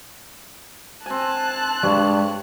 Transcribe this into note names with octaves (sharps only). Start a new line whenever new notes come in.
C4 G#5 A5 F#6
G2 G3 G#3 C#5